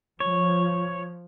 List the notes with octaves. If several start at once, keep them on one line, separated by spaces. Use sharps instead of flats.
F3 C#5